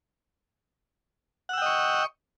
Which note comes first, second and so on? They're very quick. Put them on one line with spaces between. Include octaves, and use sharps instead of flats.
F#5 E6 G5 D#5 C#6